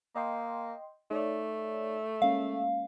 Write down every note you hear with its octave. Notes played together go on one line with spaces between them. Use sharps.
A#3 D#5 G5 C6
A3 D#4 C#5 D5
G#3 A#3 C#4 F5